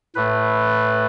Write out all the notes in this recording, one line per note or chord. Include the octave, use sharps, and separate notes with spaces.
A2 A3 B4